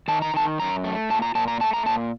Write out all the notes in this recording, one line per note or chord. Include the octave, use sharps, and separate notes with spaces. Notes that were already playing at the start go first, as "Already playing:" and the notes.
D#3 A5
A#5
D#3 A5
F#2 A#5
A3
A#2 A5
A#5
A#2 A5
A#5
A3 A5
A#5
A#2 A5